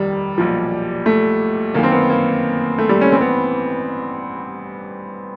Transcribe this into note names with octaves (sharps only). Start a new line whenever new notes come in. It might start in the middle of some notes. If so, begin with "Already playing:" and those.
Already playing: F1 D#2 D#3 G3
B1 A#2 F3
A3
G1 F#2 D#3 A#3
C4
B3
A#3
A3
G3
C#4
A1 G2 E3 C4
B3